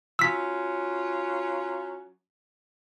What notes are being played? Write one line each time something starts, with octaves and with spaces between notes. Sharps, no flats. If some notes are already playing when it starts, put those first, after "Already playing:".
F#3 C#4 F4 E6 B6